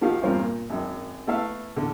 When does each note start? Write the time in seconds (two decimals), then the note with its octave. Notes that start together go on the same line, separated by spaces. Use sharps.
0.01 D#3 F3 F#4 G4 F5
0.22 E2 G2 C4 F4 A#4
0.40 A#2
0.70 G#1 F#2
1.27 A3 B3 E4 A4 E5 F5
1.76 E2 D3